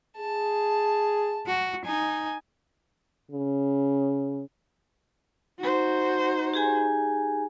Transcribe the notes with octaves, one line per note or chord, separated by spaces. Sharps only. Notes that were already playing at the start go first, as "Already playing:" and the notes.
G#4 A5
F#4
D#4 G#5
C#3
D#4 F#4 C5
G4 G#4 G#5